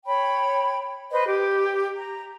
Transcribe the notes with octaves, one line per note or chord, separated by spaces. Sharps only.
C#5 G5 B5
B4 C5 D#5
G4
A#5